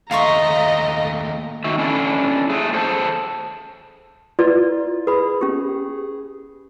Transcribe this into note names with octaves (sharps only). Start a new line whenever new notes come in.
D#2 A3 D#5 F5 A#5 C6 C#6
D#3 F#4 E5
C#4 D4 E4 A4
A3 G#4
G#4 A4 C5 F5 A5
E4 F4 B4 D5
G#4 B4 B5
C#4 G4